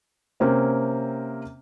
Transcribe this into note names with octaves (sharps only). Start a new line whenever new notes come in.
C3 A#3 C4 C#4